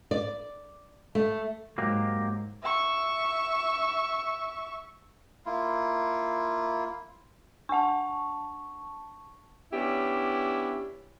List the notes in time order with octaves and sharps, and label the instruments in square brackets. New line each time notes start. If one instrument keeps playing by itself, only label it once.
[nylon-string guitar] D5
A3
[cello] G#2 [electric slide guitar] F#3 A#3 G4
[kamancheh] E5 C#6
[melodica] A#3 E4 F4
[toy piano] D4 F#5 [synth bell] A5 C#6
[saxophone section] B3 C#4 D4 E4 G4